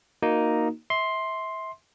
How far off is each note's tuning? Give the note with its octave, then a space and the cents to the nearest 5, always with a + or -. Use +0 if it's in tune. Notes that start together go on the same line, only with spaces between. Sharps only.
A#3 +0 D#4 +0 F#4 -20
E5 -25 C6 +5